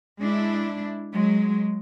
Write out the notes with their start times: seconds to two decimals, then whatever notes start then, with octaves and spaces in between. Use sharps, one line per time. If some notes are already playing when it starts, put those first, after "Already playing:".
0.19 G#3 D4 E4
1.12 F#3 G#3